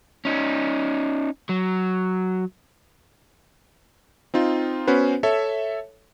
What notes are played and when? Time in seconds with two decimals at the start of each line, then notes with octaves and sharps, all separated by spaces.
0.25 C#4 D#4
1.49 F#3
4.34 C4 D#4 F4
4.87 B3 C#4 F#4 B4 C5
5.23 A4 C#5 E5